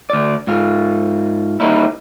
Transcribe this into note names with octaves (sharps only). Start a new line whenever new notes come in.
D2 D5
G#2 F4
G3 A#3 C#4 D#4 E4